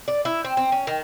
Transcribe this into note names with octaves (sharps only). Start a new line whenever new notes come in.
D5
E4
C4
C4
C#4
D#3